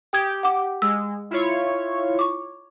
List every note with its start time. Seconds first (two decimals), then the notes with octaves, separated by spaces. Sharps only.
0.13 G4 G5 D#6 G#6
0.43 F#5 D6
0.82 G#3 E6
1.31 E4 F4 C#5
2.19 C#6 D6